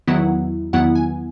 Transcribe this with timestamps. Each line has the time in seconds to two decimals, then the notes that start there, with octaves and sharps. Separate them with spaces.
0.08 E2 D#3 F#3 B3 E4 F#5
0.73 E2 D#3 F#3 B3 E4 F#5
0.95 G#5